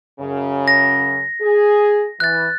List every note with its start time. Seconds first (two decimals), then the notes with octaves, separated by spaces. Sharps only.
0.20 F#2 C#3
0.68 A#6
1.41 G#4
2.20 E3 F#6 A6